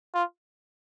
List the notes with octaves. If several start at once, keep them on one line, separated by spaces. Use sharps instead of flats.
F4